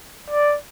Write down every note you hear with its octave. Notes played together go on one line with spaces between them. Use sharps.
D5